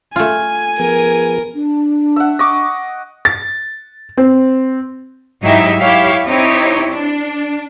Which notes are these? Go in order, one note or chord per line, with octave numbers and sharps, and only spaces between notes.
A3 F4 G#5
F3 B3 G#4 A#4
D4
E5 F#5
D#5 C#6 D6
A6
C4
G#2 F#3 D#4 E4 G4 E5
E4 G4 C#5 E5 F5
C4 D#4 E4 G4 C#5
D4